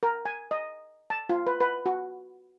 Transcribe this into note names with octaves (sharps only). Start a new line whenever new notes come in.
A#4
G#5
D#5
A5
F4
B4
B4
F#4